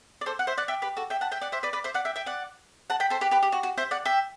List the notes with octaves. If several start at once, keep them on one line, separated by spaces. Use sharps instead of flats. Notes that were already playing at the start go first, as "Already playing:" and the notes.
D5
A4 C5
F#5
C5 E5
D5 F#5
E5 G5
G4 B4
F#4 A4
E5 G5
F#5 A5
E5 G5
D5 F#5
C5 E5
B4 D5
B4 D5
C5 E5
D5 F#5
E5 G5
E5 G5
D5 F#5
F#5 A5
G5 B5
A4 C5
G4 B4
G4 B4
G4
F#4
F#4
C5 E5
D5 F#5
E5 G5